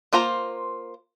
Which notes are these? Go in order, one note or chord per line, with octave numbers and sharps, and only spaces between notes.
A#3 F4 C5 A#5